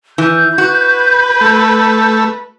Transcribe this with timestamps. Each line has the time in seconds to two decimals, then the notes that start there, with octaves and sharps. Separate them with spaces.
0.18 E3 G6
0.58 F#4 B4
1.41 A3